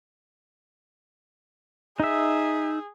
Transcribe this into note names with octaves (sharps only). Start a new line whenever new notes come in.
D#4 G#4 E5